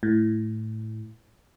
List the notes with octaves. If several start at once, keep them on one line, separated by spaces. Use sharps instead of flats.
A2